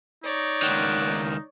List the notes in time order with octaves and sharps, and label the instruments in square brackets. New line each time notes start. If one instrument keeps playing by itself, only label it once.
[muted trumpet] D#4 [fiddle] C#5 D5
[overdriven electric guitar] C#2 D#3 [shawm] F#5